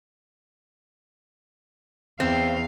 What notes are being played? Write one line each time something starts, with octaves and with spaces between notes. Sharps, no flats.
E2 C4 F5